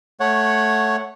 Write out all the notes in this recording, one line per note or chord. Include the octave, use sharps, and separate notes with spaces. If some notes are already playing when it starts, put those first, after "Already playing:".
A3 C#5 F#5